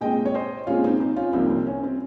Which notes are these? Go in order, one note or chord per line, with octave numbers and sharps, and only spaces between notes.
A#2 G#3 C4 D#5 G5
C#5
C5 D#5
A#2 G#3 C4 C#4 F4
C4 D#4
C4 D#4
C#4 F4
C2 C3 F3 A#3 C4 D#4
C4
C#4
C4